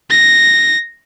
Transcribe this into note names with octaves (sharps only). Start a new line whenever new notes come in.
A#6